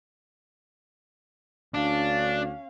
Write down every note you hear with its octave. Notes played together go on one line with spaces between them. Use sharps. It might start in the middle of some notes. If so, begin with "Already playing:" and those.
D2 C#4 D4 F5